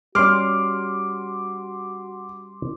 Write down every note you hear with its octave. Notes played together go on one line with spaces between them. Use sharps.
G3 C#4 F#4 C6 D6 F6